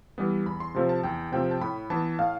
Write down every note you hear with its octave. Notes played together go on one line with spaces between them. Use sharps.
E3 G3 B3
E2 B5
C6
C3 F3 A3 C4
A5
E2 G5
C3 F3 A3 C4 G5
A5
A2 B5
E3 B3 A5
A2 F5